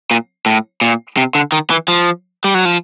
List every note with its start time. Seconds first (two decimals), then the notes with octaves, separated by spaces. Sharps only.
0.11 A#2
0.46 A2
0.81 A#2
1.17 C3
1.35 D3
1.52 D#3
1.70 E3
1.88 F3
2.44 G3
2.54 F#3
2.65 F3